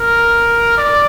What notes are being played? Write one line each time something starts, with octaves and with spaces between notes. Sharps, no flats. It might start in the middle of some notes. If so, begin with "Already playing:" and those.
Already playing: A#4
D5